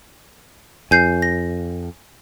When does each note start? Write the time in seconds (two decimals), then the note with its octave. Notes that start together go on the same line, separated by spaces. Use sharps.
0.91 F2 G#5 G6 C7
1.22 A#6